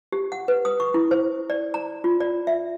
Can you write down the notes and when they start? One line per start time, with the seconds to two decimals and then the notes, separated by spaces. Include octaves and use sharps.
0.12 G4
0.32 F#5
0.48 B4
0.65 D#6
0.80 C#6
0.94 E4
1.11 C5
1.50 D5
1.74 A#5
2.04 F4
2.20 D5
2.47 E5